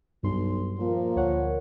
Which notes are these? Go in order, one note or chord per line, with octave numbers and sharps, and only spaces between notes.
B1 G2 C6
A#2 F3 A#3 A#4
D2 C#5 F#5